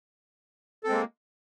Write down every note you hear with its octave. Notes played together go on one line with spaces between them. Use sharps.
G#3 A#3 C4 A4